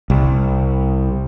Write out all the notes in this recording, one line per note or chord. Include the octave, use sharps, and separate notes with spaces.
C2